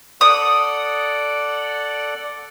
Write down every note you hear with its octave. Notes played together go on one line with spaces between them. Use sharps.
A4 D5 F#5 D#6